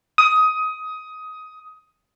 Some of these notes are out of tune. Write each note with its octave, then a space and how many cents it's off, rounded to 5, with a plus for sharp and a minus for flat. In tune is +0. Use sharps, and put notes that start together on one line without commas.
D#6 +15